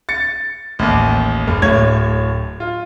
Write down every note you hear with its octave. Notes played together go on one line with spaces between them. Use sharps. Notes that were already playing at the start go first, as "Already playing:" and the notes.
A6 C#7
A1 D#2
F#1 A#3
D1 A2 C#5 G#6
F4